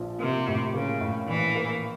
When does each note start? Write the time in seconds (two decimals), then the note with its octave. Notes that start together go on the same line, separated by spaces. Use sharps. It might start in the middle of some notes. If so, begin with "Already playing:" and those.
Already playing: A#1 F3
0.20 C3 A#3
0.48 A2
0.74 C#3 A#3
1.01 A2
1.29 A#1 E3
1.55 A#3